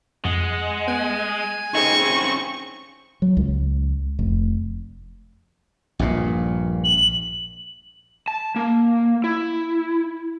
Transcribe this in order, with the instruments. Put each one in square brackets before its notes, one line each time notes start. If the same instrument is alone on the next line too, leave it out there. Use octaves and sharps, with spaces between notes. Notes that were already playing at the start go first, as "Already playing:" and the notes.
[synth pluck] F2 [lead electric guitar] G#3 [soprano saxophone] F#5
[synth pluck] B3 F#6 D7 [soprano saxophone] G#5
[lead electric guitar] C#3 C4 [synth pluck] D#4 G#4 [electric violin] C#6
[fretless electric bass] F#3
C#2
F1
[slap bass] A#1 G2 A#2
[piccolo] F#7
[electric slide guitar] A5
A#3
E4